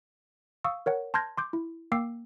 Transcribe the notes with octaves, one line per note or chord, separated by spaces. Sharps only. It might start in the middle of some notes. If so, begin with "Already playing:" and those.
F5 C#6 D#6 E6
A#4 C#5 F#5
A5 C6 F6 G6 G#6 A#6
C6 D6 G6
E4
A#3 G5 D6 E6 C7